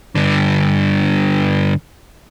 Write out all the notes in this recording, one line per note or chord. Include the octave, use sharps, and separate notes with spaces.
G2 D3